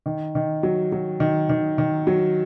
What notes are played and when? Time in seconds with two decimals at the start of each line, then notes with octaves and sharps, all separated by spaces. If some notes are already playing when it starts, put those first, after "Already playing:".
0.06 D#3
0.35 D#3
0.63 F#3
0.92 F#3
1.20 D#3
1.49 D#3
1.78 D#3
2.07 F#3